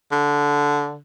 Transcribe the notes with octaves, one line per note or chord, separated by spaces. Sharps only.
D3